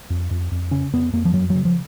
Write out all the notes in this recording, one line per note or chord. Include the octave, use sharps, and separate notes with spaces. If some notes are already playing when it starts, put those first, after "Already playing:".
F2
F2
F2
C#3 C#4
F2 B3
F2 A#3
F3
F#2 F#3
F#3
C#3
F3